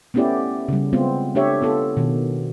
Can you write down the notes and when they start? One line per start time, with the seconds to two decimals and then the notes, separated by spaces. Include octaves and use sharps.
0.14 A3 B3 C#4 E4 G4 D5
0.68 C#3 G3
0.93 G#3 B3 C4 F4
1.35 A3 D4 G4 C#5 E5
1.62 B3 F4 A4
1.97 B2 D#3